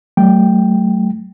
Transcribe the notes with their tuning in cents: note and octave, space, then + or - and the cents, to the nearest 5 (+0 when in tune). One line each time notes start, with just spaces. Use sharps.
F#3 +35 A3 +0 G5 +0